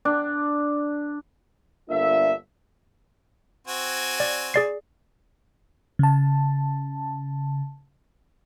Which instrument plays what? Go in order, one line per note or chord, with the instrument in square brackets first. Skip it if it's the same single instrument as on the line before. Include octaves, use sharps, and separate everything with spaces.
[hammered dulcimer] D4
[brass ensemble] G1 A#3 D4 F4 A4 E5
[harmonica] C4 F#4 G#5
[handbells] D5
G#4 D5 C7
[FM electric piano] C#3 A5